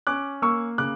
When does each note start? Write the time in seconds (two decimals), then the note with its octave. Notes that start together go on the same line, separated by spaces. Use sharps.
0.07 C#4 D6 F#6
0.42 A#3 C#6 E6
0.78 C#3 D6 F#6